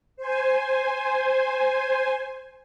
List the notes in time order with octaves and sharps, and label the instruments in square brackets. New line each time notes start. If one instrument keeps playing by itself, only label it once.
[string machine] C5 G#5